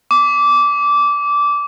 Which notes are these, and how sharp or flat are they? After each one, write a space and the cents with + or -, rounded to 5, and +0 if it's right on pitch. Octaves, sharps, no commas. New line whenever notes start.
D6 -15